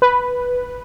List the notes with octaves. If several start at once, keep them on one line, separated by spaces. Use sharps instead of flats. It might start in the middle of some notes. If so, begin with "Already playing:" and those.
B4